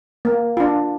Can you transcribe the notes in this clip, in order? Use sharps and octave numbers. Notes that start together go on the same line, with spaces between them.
A#3
D4 F4